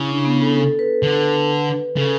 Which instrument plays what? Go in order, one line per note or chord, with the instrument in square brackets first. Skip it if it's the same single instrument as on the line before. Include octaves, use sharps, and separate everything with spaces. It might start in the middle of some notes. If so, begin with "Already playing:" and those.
Already playing: [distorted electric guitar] C#3 [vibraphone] E4
[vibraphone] D4
B3
A4
A4
B4
[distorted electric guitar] D3
[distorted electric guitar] C#3 [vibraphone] A4